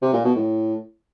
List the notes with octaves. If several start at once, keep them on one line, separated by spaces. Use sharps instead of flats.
C3
A#2
B2
A2